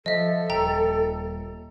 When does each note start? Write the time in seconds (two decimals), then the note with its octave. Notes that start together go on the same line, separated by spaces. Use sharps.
0.06 F3 A4 D#5 E5
0.50 D#1 G5 A#5